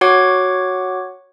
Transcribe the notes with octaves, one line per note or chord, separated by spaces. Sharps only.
F#4 C#5 F#5 D6 G#6